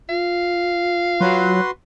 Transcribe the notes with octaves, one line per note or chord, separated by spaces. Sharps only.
F4 F5
F#3 F#4 B4 C6